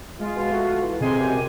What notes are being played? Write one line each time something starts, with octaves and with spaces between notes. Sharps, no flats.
G#3 F4
B2
A3 F#4
E3
F2 C3 G#3 G#5 C6
F#2 G4